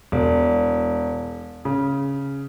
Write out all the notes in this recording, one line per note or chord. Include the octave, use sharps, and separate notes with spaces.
E1
C#3